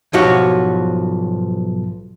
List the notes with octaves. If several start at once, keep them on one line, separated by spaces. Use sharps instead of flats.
B1 G#2 F3 G3 F#4 C#5